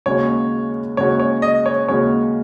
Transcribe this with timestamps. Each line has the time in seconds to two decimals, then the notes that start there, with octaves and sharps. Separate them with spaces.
0.06 D#2 C#3 G#3 C#4 F#4 C#5
0.97 D#2 C#3 G#3 C#4 F#4 C#5
1.20 C#5
1.42 D#5
1.66 C#5
1.88 D#2 C#3 G#3 C#4 F#4 C#5